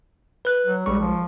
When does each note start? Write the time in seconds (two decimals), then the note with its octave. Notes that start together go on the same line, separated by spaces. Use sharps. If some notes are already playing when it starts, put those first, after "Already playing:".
0.45 B4 F#6
0.67 F#3
0.86 A#1 G3 G#3 C#6
1.00 F3